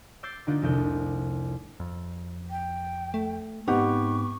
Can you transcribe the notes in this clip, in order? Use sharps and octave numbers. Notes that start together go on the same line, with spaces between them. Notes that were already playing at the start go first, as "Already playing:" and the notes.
D6 E6 G6 A6 C7
D3 A#3 D4 D#4 F4
F1 C2 G6
F2
G5
A3
G#2 B3 C4 D#4 G4 F#5 C#6